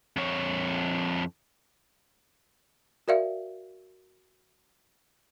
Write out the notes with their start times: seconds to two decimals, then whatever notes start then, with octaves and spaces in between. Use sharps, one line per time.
0.17 F2 C#5
3.08 F#4 A#4 D5 E5 F5